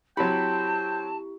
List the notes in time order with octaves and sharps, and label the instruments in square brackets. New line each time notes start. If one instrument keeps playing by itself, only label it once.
[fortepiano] F#3 C4 B5 [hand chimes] E4 G4 [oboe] G5 [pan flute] A5